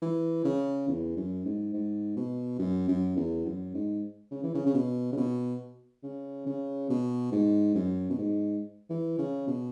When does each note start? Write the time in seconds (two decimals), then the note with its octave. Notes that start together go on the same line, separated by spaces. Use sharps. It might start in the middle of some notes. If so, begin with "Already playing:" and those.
0.02 E3
0.44 C#3
0.88 E2
1.16 F#2
1.45 G#2
1.73 G#2
2.16 B2
2.59 F#2
2.88 F#2
3.16 E2
3.45 F#2
3.74 G#2
4.31 C#3
4.43 E3
4.55 C#3
4.66 C#3
4.74 B2
5.12 C#3
5.17 B2
6.03 C#3
6.46 C#3
6.89 B2
7.31 G#2
7.75 F#2
8.10 B2
8.18 G#2
8.90 E3
9.18 C#3
9.47 B2